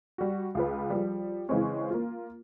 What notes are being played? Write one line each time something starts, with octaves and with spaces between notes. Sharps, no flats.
G3 F#4
C#2 F4 B4
F3 G3
C#3 E3 G#3 C4 C#4
A#3 F4